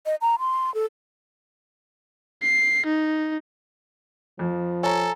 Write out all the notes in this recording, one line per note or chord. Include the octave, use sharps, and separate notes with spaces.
D#5
A#5
C6
A4
C7
D#4
F2 F3
A4 C#5 G#5 A#5